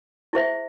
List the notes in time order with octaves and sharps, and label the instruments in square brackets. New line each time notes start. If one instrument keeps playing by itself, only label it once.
[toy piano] E4 G#4 C5 E5